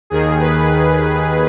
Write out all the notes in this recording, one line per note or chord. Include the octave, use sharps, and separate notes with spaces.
D#2 D#3 G#4
B4